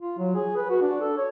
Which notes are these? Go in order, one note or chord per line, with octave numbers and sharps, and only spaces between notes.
F4
F#3
G#4
B4
F#4
D4
A4
C#5